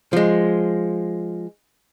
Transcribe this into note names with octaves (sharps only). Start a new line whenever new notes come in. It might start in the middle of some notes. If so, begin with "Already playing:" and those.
F3 G#3